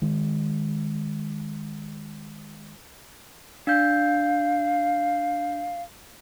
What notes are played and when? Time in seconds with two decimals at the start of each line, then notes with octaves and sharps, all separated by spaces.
0.02 D#3 G#3
3.67 D4 F5 G6